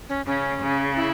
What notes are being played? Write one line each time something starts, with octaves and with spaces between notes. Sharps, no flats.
C#4
C#3 C#4
C#3
E4